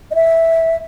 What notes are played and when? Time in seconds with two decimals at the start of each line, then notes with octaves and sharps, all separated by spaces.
0.11 D#5
0.15 E5